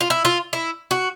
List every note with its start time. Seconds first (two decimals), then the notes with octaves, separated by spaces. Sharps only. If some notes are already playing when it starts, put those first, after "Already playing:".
0.01 F4
0.10 E4
0.25 F4
0.53 E4
0.91 F#4